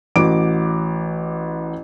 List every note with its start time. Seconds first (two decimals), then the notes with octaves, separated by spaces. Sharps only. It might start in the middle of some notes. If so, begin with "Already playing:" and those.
0.16 A1 F#4 D6 D7